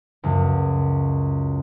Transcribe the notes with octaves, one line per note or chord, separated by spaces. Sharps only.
C#2 F#2